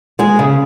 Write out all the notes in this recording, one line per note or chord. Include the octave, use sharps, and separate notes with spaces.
G#3 G#4
C#3